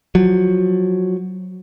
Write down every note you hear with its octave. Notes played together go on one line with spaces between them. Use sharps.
F3 F#3